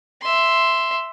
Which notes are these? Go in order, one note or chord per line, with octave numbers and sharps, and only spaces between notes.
E5 C6